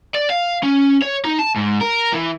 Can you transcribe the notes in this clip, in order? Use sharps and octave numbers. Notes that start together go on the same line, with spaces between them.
D5
F5
C#4
C#5
D#4
A5
G#2
A#4
E3